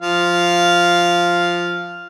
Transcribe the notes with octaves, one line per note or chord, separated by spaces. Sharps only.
F3 F5